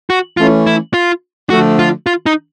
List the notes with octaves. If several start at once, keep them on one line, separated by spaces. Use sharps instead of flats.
F#4
E3 A3 C#4 F4
E4
F4
D3 F3 A3 F#4
F4
F4
D#4